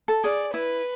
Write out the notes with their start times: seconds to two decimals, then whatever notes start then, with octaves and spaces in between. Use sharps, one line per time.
0.08 A4
0.24 G#4 D5
0.54 E4 B4